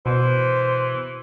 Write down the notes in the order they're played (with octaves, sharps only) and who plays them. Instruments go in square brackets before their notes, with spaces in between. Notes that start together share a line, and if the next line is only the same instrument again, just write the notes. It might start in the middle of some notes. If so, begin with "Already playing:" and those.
[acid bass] B2 [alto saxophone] E3 [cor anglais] C5